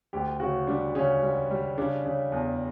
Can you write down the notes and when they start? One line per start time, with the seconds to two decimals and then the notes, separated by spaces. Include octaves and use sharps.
0.13 D2 G4
0.40 C#3 F#4
0.67 G3 D4
0.95 C#3 C#4
1.22 G3
1.50 G3
1.78 C#3 D4
2.05 C#3
2.32 E2